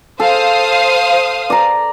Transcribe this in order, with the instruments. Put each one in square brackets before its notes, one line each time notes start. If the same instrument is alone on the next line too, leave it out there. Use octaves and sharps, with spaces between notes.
[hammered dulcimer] A4 [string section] C5 F5 D#6
[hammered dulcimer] D5 A#5